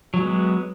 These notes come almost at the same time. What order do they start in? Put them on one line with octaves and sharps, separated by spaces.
F#3 G#3 B3